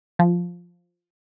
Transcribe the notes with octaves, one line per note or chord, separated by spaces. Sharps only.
F3